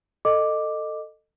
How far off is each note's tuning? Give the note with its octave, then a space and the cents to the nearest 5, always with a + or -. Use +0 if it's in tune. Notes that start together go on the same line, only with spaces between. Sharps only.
A4 +15 D#5 -15 D6 +0